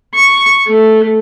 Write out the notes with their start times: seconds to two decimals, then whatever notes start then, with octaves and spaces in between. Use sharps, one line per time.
0.14 C#6
0.67 A3